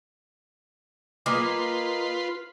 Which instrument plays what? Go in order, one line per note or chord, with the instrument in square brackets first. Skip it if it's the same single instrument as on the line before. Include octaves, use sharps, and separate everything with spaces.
[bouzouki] A#3 D#5 G#5 [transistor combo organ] F4 B4 C6 [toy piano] D6